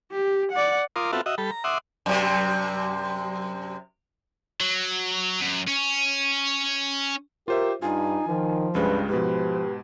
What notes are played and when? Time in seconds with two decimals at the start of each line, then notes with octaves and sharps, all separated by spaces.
0.12 G4
0.52 D5 F#5
0.96 F4 A#4 C6 D6 D#6
1.13 B3 C4 F4 F#4 A4 E5
1.26 F#4 D#5 E5
1.38 G3 A4 B5
1.51 A#5
1.64 E5 F#5 C6 D6 D#6
2.06 F#2 C3
4.60 F#3
5.41 F#2
5.68 C#4
7.48 F4 G4 A#4 C5 E5
7.82 G2 D#4 F4 G#5
8.28 D#3 F3
8.75 C#2 G2 C#3 G#3 B4
9.09 G#2 B2 F3 G4 B4